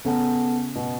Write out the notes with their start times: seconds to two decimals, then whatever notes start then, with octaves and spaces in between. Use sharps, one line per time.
0.05 C#3 B3 A4 F#5 A5
0.75 B2